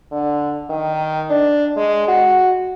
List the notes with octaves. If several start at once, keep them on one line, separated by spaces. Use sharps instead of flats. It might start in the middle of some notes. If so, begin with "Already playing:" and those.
D3
D#3
D4
G#3
F#4